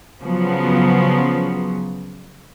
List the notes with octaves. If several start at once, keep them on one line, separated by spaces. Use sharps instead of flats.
C#3 F3 F#3 B3